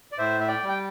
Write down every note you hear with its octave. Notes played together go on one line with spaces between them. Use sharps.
D5
A2 C5 E5
E5
D5 G5
G3
G5